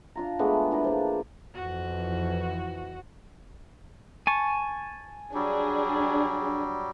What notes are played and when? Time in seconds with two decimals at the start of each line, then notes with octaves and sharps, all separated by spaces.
0.15 D4 F4 A#5
0.39 G#3 A3 B3 D4
0.71 E3 D4 A#4 B5
0.84 F3 A#3
1.55 F2 E3 F#4
4.27 G#5 A5 C#6
5.34 F#3 G3 D4 G#4